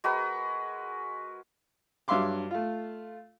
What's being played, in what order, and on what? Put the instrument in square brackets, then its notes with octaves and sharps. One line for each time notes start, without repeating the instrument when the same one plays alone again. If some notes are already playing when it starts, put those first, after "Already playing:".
[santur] G#3 F#4 A#4 B4
[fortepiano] G2 F#3 E5 F5 C6 D6
A3 F4